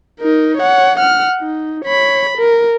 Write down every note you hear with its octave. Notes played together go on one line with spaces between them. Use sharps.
D#4 A#4
C#5 F#5
F#5 F6
D#4
C#5 B5
A#4